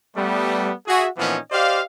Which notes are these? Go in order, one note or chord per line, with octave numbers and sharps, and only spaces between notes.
G3 A3 B3
F#4 G#4 E5
A#2 E3 F3 B3 C#4 D#4
G4 C5 D5 D#5 F5